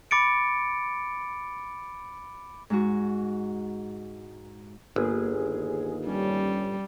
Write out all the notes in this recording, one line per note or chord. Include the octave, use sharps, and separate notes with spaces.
B5 D6 A6 C#7 D7
G#2 G#3 F#4
G1 A#3 G#4
D#2
G3 C#4